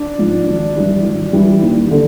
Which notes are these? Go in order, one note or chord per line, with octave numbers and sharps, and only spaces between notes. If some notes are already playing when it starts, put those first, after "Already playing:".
Already playing: D4 D5
G#2 F3
G#1
G2 E3 G3
G#1
G2 E3 G3
D#2
D3